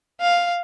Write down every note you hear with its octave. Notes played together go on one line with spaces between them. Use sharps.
F5